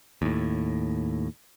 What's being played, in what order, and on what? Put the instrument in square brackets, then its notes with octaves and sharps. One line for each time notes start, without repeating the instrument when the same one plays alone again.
[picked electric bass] D#2 A2